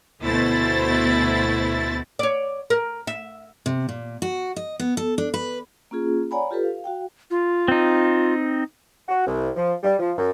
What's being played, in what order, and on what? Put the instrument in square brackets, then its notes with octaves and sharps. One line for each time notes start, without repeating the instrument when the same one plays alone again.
[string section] D2 B2 A3 E4 C5 A6
[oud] C#5 D5
A#4
E5
[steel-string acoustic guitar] C3
A#2
F#4
D#5
B3
A4
D4
B4
[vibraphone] A#3 C#4 F4 G#4
C#5 D5 F#5 G#5 A#5 B5
F4 G4 A4 B4
F5
F#4 F5 G5
[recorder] F4
[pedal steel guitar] C4 D#4
[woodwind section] F#4
C2
F3
G3
F3
F#2